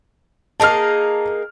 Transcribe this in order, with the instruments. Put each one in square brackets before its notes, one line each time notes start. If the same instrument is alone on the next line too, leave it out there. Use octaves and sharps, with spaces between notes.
[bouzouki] A#3 D#4 G#4 [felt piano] A5 F6